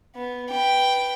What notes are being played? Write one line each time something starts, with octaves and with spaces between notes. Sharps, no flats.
B3
B4 G5